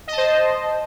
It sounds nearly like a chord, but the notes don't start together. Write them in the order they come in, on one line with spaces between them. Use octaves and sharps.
D#5 A5 C5